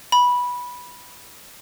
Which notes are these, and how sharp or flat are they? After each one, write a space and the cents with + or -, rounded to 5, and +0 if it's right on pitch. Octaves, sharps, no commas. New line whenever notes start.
B5 -10